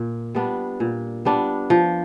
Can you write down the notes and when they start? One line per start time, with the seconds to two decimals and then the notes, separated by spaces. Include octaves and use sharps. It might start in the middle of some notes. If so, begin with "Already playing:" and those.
Already playing: A#2
0.35 G3 B3 D4
0.80 A#2
1.25 G3 B3 D4
1.70 F3